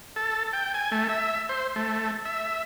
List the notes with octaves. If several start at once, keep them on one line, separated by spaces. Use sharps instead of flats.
A4
G5
G#5
A3
E5
C5
A3
E5